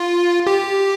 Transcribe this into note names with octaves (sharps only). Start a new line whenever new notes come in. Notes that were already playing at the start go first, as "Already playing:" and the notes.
Already playing: F4
G4